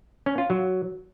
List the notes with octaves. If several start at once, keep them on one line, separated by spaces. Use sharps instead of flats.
C#4
F4
F#3